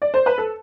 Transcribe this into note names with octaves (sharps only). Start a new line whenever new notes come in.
D5
C5
B4
A4